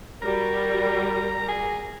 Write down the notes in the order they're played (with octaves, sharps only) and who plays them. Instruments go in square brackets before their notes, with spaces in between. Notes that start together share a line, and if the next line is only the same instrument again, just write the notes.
[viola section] G3 F#4 A#4 [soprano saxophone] A#5
[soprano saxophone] G#4